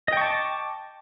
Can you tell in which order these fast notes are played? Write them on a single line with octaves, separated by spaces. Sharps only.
D#5 G5 C#6 A5 D6